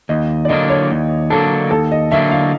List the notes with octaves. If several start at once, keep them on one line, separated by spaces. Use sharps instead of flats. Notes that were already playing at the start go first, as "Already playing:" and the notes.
D#2 D#5
D5
D3 F#3 A#3 D4 D#5
C#5
D#2
D3 F#3 A#3 D4 A4
D#2 A4
D#5
D3 F#3 A#3 D4 E5
F5